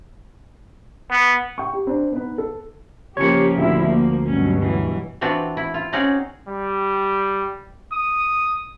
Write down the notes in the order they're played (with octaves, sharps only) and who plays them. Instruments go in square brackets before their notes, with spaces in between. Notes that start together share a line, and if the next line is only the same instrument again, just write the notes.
[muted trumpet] B3
[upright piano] G5 C#6
G4
C4 D4
B3 D#4 B4
A4
[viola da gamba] C#3 F3 A#3 [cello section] G4 [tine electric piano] C#5 C#7
[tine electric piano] D2 [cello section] A#2 D3 E4 [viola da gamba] F3
[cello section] A#3
[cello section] G2 B2 F#3 [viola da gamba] C#4
[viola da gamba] E3
[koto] E3 C4 D4 F4 F#4
E4
F4
C4 C#4 D#4 F#4 G#4 D5
[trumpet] G3
D#6